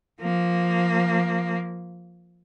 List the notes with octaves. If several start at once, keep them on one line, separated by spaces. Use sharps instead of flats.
F3 A#3